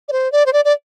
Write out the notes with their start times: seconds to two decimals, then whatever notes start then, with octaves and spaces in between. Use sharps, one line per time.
0.08 D5
0.12 C5
0.32 D5
0.46 C5
0.53 D5
0.65 D5